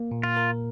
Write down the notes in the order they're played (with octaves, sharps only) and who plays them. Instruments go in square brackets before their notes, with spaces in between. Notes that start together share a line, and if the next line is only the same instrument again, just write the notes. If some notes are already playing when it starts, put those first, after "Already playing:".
Already playing: [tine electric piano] A#3
A#2
[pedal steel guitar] F4
[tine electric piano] A#4